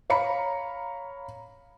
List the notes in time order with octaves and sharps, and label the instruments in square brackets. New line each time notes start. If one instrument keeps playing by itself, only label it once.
[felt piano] C#5 F5 A#5 B5 C#7